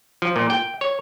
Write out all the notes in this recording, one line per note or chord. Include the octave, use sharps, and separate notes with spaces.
F3
A#2
G5
C#5